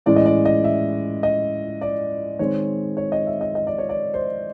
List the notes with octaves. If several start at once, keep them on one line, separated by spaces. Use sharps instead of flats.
A2 E3 G#3 C#4 D5
D#5
D5
D#5
E5
D#5
D5
D#3 G#3 C4 C#5
C#5
D#5
E5
D#5
D#5
D5
C#5
D5
C5